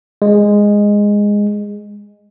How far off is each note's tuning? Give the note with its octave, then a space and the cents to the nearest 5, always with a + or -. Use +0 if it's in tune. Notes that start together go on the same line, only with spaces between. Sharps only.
G#3 -10